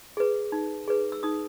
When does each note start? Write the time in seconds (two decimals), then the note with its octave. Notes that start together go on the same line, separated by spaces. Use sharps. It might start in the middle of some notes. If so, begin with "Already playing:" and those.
0.17 G#4 B4
0.52 D#4
0.88 G#4 B4
1.12 E6
1.23 D#4 D#6